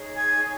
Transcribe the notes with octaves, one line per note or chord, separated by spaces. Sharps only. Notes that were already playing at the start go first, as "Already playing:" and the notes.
Already playing: D#4 G#4 C#5
G#5 G#6